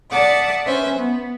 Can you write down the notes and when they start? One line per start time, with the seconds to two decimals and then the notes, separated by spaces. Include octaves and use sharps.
0.11 D5 E5 F#5 A5 D6 D#6
0.66 C#4 B4 C5 E5
0.98 B3